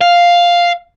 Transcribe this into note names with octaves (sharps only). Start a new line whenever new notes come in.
F5